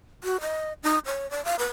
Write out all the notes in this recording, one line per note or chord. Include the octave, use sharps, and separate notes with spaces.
F#4
D#5
D#4
C#5
D5
F5
B4